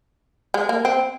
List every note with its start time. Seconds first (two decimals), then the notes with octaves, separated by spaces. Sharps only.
0.54 G#3
0.69 A#3
0.85 C4